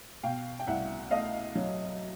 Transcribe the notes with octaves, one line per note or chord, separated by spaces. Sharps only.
B2 F5 G5
G5
C2 E5 F#5
A3 D#5 F5
F#3